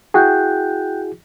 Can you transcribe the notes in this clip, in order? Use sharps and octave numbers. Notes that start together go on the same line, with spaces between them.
E4 F#4 G#4 G5 F#6 G6